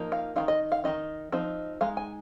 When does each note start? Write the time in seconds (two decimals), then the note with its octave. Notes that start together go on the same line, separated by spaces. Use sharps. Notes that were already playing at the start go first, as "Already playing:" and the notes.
Already playing: F3 A#3 D#4
0.12 F5
0.36 D#3 C4 D#4 F5
0.48 D#5
0.72 F5
0.84 D#3 C4 D#4 D#5
1.32 F3 C4 D#4
1.81 G#3 D#4 F5
1.97 G#5